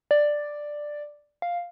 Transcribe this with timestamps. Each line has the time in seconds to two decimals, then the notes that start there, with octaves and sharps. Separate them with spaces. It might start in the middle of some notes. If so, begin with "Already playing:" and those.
0.11 D5
1.42 F5